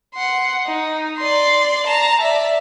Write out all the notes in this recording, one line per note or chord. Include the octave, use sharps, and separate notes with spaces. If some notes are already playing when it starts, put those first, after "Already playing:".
F#5 C6
D#4
D5 C6
A5 A#5
D5 E5